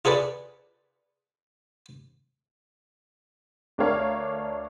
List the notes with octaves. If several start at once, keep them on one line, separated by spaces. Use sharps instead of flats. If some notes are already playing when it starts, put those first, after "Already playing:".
F4 G#4 A4 B4 D5
D2 D4 A4 A#4 C#5 F5